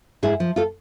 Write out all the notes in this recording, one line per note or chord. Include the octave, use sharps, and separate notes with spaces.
G#2 E4 G#4
F3
F4 A4